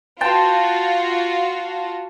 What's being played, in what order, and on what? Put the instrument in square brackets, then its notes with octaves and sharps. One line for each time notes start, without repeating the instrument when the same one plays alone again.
[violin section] F4 F#4 [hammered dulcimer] G5 A5 C6